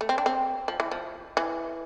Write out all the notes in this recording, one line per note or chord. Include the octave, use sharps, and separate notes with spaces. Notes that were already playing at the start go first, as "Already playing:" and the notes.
A3
C4
D4
C4
F3
E3
F3
E3